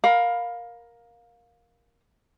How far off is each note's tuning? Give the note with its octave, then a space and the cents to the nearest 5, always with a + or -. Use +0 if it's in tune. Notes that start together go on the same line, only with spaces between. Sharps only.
A#4 +10 F5 +20 B5 +0